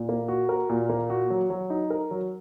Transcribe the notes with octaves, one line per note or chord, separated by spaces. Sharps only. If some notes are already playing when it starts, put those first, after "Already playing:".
Already playing: A#2
A#3
F#4
A#4
A#2
A#3
F#4
F#3
F#3
D#4
A#4
F#3